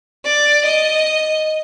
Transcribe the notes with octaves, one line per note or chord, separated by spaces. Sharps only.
D5
D#5